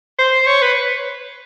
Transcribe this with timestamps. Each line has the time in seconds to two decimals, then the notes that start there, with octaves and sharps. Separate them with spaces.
0.19 C5
0.47 C#5
0.62 B4